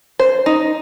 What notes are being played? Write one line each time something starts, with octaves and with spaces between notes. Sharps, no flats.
C5
D#4